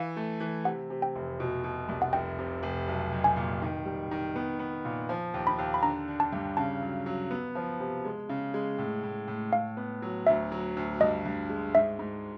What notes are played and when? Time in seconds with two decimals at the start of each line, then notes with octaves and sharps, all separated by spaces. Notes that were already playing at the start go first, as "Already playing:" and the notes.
Already playing: E3 F5
0.16 A3
0.40 E3
0.65 C3 F#5
0.90 C3
1.02 G5
1.15 F1
1.40 B2
1.64 B2
1.89 C2
2.02 F#5
2.13 F1 G5
2.39 C3
2.63 F1
2.87 B1
3.12 B1
3.24 G#5
3.36 A#2
3.62 D#3
3.85 G3
4.11 D#3
4.36 B3
4.59 B3
4.85 A#2
5.09 F3
5.34 D#2
5.47 B5
5.58 D#2
5.74 B5
5.83 D3 A#5
6.08 D3
6.20 A5
6.33 G2
6.57 C#3 A5
6.82 F#3
7.06 F#3
7.31 B3
7.55 F3
7.80 C3
8.05 G#3
8.29 C#3
8.54 G#3
8.78 A2
9.03 A2
9.28 A2
9.52 A2 F5
9.77 B3
10.02 F#3
10.27 D2 E5
10.52 F#3
10.77 D2
11.00 G2 D#5
11.25 G2
11.49 G#3
11.74 G#2 E5
11.99 G#2